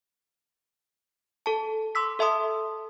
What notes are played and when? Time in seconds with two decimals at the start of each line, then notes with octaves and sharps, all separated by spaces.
1.46 A4 A5
1.95 C6 D6 E6 B6
2.19 A4 E5 A5 C6 D#6